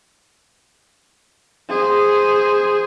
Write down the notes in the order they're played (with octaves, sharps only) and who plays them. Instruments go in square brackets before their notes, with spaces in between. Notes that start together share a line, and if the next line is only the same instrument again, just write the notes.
[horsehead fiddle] G#4 C5